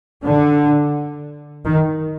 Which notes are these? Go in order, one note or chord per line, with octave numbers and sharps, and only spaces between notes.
D3
D#3